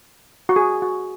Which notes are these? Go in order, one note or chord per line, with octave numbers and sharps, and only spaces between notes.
F#4
G#4
F#4